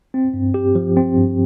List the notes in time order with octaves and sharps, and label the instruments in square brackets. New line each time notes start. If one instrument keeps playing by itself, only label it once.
[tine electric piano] C4
G2
G4
F3
C4
G2